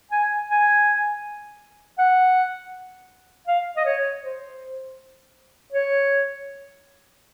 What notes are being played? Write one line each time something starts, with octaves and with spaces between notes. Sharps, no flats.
G#5
G#5
F#5
F5
D#5
C#5
C5
C#5